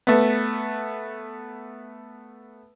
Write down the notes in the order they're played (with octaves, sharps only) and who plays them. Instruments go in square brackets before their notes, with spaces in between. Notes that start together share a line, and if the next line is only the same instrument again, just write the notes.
[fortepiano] A3 B3